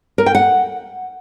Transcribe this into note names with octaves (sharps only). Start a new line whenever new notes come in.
A#4
G5
F#5